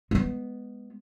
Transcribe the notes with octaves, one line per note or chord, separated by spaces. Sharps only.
G#3 B3